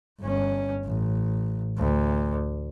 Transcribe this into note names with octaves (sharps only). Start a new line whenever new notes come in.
G1 C#4
A1
D2